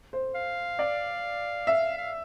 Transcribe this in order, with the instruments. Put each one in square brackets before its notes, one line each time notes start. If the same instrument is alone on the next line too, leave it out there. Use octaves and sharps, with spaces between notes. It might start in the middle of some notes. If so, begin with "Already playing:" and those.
[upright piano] C5
[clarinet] F5
[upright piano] D5
E5
[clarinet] F5